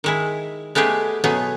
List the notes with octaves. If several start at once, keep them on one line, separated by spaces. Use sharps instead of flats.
D#3 G#3 E4
G#3 A3 B3 G4 G#4
B2 F#3 A3 B3 G#4